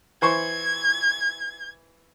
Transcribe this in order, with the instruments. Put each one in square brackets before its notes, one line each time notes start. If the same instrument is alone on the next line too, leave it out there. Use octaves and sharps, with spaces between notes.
[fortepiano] E3 C5 C#6 [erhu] G#6